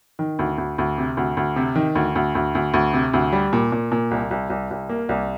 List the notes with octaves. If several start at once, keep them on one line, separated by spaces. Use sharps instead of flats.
D#3
D2
D2
D2
C3
D2
D2
C3
D#3
D2
D2
D2
D2
D2
C3
D2
G3
A#2
A#2
A#2
C2
C2
C2
C2
A#3
C2